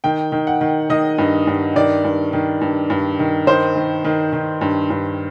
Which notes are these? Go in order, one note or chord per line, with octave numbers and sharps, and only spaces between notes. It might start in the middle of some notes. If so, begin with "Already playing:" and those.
D#3 G5
D#3
F#5
D#3
D#3 D#5
G2
G2
D#3 D5
G2
D#3
G2
G2
D#3
D#3 C5
D#3
D#3
D#3
G2
G2